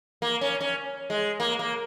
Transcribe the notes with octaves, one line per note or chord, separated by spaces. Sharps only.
A#3
C#4
C#4
G#3
A#3
A#3